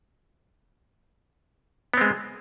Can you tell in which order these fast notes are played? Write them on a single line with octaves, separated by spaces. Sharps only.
B3 C4 G#3